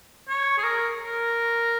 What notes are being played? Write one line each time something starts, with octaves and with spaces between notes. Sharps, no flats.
C#5
G#4
A#4
A#4